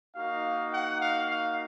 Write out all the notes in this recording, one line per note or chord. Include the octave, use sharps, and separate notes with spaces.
A#3 D#4 F#4 F5
F#5
F5
F5